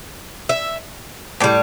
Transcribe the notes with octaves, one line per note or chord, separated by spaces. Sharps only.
E5
A2 G3 D5